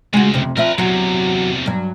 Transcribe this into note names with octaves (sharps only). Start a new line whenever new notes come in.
C#2 C#3 G#3 F#4
F2 C3
F3 C4 A#4 B4 E5
E2 C3 F#3 F#4
G2 F#3